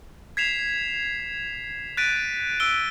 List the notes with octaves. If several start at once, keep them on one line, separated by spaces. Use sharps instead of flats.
G#6 B6 C7 E7 F7
F#6 A6 B6 D7 D#7
E6 D7 G7